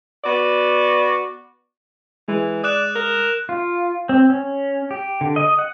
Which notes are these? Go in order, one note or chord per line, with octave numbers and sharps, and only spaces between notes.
B3 F#4 D5
E3 G#3
D5 D#6 F#6 E7
A#4
F4
C4
C#4
G4
D3
D#5
F#5